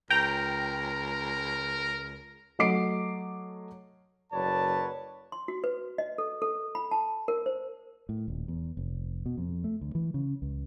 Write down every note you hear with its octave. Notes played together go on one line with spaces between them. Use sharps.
C#2 A#4 G5 A#5
F#3 A3 D#5 D6 C7 D7
F#1 F#3 B4 C#5 D5 A5
C6
F#4
B4
D#5
A4
A4
B5
A5
A#4
C5
A2
D#1
E2
F1
B2
F2
A3
D2
E3
C#3
C#2